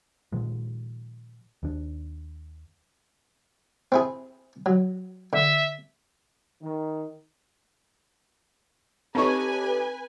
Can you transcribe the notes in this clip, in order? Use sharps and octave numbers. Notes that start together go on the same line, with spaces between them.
A#2 D#3 F3 G#3
D#2 D4
C4 E4 G#4
F#3
D3 E5
D#3
C4 D#4 G4 A4 B4 C#5 G#5 C#6